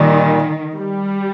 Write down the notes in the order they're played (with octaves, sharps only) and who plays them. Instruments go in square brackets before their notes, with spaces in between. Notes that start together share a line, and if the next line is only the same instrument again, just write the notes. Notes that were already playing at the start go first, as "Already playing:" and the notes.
Already playing: [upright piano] A#2 G3 [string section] D#3
[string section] G3